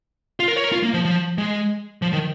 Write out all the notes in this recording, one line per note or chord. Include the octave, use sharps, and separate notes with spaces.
F4
A#4
C#5
A#4
F4
A#3
F3
F3
G#3
F3
D#3